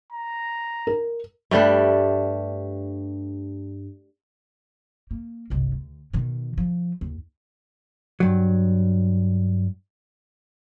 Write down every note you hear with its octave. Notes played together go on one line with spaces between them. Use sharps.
A#5
A#4
G2 G3 A3 D4
A#3
G1 C2
D2
B2 D#3
F3
D#2
G2 F#3